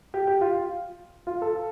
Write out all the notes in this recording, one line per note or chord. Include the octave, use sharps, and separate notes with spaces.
G4
G4
F4
F4
A4